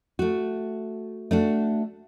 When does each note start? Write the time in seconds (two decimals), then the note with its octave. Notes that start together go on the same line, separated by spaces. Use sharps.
0.19 A3 F#4
1.31 A3 D4 F#4